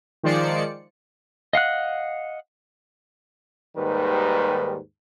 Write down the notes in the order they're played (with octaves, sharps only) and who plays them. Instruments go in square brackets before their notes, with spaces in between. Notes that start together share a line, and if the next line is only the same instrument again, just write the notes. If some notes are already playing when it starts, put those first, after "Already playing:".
[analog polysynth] D#3 F3 G#3 C5 D5 C#7
[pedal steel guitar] D#5 F5 F#5 F#6
[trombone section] D#2 G#2 D#3 G3 B4